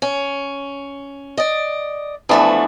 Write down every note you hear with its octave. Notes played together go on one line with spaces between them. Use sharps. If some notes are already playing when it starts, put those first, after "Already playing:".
C#4
D5 D#5
E3 F3 A3 B3 D4 F#4